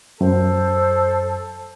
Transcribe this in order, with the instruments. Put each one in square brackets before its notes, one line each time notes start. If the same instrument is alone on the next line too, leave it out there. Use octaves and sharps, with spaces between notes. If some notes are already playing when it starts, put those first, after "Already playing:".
[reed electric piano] F#2 [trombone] A4 [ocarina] C5